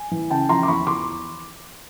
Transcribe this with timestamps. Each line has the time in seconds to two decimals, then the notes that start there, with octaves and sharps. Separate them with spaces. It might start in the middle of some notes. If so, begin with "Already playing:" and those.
Already playing: G#5
0.11 E3
0.30 C#3 G5 A5
0.49 F3 A#5 C6
0.63 D6
0.68 E2 B5 C#6
0.87 E2 C6 D6